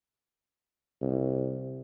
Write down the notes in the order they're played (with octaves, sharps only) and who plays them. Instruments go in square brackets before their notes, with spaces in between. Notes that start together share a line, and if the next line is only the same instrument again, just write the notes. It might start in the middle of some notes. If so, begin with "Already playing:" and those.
[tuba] C2